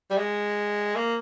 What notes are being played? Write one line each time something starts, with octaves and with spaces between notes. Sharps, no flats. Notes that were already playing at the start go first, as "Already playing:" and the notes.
G3
G#3
A#3